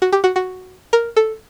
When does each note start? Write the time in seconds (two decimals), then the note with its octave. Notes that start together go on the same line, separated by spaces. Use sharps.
0.02 F#4
0.12 G4
0.24 F#4
0.36 F#4
0.93 A#4
1.17 A4